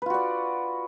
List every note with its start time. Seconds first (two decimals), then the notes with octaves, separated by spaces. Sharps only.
0.02 B4
0.06 F4
0.10 F#4
0.14 D5